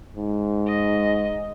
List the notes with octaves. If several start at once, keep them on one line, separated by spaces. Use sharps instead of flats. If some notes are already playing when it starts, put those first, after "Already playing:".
G#2
D#5